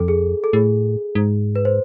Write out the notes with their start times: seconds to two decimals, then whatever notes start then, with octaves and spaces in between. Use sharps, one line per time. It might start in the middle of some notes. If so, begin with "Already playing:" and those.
Already playing: F2 A4
0.08 G#4
0.44 A4
0.53 A2 G#4
1.15 G#2
1.56 B4
1.65 C5